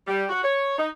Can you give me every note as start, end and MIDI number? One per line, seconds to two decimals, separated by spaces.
0.07 0.24 55
0.29 0.43 66
0.43 0.76 73
0.79 0.88 63